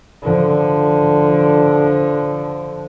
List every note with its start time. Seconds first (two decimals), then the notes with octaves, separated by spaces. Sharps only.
0.23 D3 F3